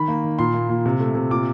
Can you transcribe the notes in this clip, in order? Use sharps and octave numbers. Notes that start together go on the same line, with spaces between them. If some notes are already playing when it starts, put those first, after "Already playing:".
Already playing: D#3 B5
A#3
D#3
A#2 C6
A#3
A#2
C3
A3
C3
A#2 D6